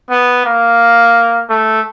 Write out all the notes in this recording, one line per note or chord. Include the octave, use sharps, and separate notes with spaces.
B3
A#3
A3